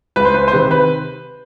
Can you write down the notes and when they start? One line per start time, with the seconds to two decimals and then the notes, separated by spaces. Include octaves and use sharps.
0.16 C#2 B4
0.25 C5
0.34 B4
0.48 C5
0.52 C3 D#3 B4
0.71 B4